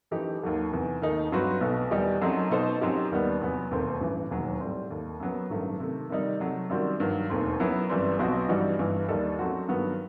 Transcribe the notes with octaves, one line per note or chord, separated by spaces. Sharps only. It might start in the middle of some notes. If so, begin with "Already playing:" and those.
F#2 E3 A3 D#4 G4
D#2 D#3 F#3 A3
E2 C3 E3
D#2 D#3 A3 D#4
G2 F#3 C4 F#4 B4
B1 B2 A3
E2 D#3 G3 D#4 G4
F#2 F#3 A3 C4 D#4
B2 A3 D#4 A4 C5
F#2 F#3 C4 D#4 G4
D#2 D#3 G3 B3
E2 C3 F#3 B3
E1 D#2 D#3 A3 C4
A1 G2 E3
E1 D#2 D#3 F#3
A2 G3 C4
D#2 D#3 A3
F#2 F#3 B3
A1 G2 D#3 F#3 A3
C3 D#3 A3
C3 D#3 G3 D#4
C3 F#3 A3
F#2 D#3 G3 C4 F#4
G2 D#3 F#3
E1 D#2 D#3 A3 C4
F#2 F#3 B3 E4
G1 F#2 E3 G3 C4
B1 B2 F#3 C4 F#4
G2 E3 G3 D#4 F#4
G1 G2 E3
D#2 D#3 G3 D#4 A4
F#2 F#3 A3 C4 F#4
G2 D#3 F#3 B3 F#4